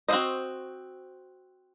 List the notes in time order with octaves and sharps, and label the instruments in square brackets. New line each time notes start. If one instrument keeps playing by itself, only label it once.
[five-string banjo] C4 F#4 A4 C5 D#5